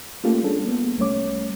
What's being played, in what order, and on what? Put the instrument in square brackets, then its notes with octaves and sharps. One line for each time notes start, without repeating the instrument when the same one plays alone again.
[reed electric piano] A3 A#3 C#4 F4 G4 A4
G3 C#4 D4 G#4 A4
A#3 B3
C2 G3 A3 C#4 C#5 D6